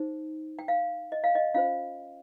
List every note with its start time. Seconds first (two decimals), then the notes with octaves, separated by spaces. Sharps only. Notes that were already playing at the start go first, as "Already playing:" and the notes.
Already playing: D#4 G#4 C5
0.59 G5
0.68 F5
1.12 D#5
1.24 F5
1.35 D#5
1.54 C#4 F4 C5 F5